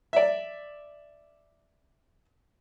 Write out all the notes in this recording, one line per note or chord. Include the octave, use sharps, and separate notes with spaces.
D5 E5